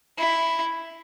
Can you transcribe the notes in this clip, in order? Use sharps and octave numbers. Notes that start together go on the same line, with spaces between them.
E4